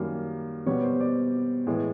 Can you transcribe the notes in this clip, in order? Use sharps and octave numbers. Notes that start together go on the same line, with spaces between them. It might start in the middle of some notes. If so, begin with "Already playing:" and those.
Already playing: F#2 D#3 G3 A#3
B2 G3 B3 C#5
C5
D5
A2 E3 G#3